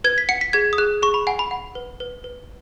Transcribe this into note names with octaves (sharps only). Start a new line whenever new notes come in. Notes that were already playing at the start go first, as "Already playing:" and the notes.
B4 G#6
B6
F#5 C#7
B6
G#4 G#6
D#6
G#4 F#6
G#4 C#6
B5
F#5 G#5
B5
F#5
B4
B4
B4